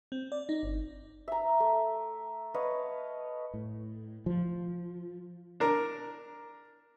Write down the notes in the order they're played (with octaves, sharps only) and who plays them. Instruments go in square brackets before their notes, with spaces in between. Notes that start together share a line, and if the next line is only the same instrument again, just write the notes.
[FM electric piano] C4
D5
D#4
G1
[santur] E5 A#5
A3
B4 C#5 D#5 F5
[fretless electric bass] A2
F3
[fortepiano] D4 A#4